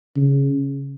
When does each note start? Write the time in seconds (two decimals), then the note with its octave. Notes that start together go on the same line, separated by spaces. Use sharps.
0.16 C#3